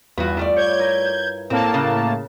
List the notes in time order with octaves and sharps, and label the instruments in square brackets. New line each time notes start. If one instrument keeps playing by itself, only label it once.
[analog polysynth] E2 [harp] G2 F4 [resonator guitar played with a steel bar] B3 F#4
[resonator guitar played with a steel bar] G3 A3 D5
[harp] C#5 [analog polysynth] G6 G#6
[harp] E4 A#4 B4
[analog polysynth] A2 A#3 A5 [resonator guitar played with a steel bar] C4
[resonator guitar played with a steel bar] C#3 [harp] A#4 F#6